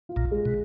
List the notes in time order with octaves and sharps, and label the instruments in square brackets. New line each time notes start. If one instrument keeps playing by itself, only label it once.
[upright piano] F4
[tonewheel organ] A#1 A#2
[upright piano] G#3
[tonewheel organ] B2